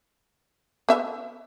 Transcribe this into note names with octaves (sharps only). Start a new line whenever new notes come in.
B3 E5